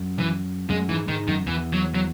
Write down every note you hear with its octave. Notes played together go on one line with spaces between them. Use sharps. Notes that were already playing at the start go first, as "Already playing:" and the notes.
Already playing: F#2
E3
F#2 G#3
G#2 E3
G#2 D#3
F#2 D#3
E2 E3
F#3
F#3